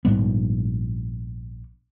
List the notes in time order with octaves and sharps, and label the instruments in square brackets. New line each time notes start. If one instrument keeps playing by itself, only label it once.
[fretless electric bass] A#1 G#2 G3 B3